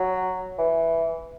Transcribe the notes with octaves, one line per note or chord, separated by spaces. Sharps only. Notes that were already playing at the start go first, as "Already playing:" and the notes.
Already playing: F#3
E3